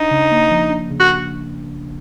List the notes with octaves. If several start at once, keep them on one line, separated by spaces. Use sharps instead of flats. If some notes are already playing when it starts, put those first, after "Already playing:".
Already playing: D4 D#4
C#3
A#3
F3
D4
C#3
F#4